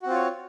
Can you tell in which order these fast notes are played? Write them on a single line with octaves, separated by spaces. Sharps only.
F#4 C4 F4 C#5